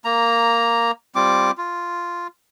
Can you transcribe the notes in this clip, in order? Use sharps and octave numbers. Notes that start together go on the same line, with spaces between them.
A#3 A#5
G3 C4 F4 D6
F4